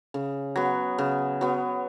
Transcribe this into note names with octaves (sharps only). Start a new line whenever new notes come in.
C#3
F#3 B3
C#3
F#3 B3